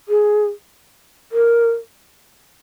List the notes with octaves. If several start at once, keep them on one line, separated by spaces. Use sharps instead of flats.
G#4
A#4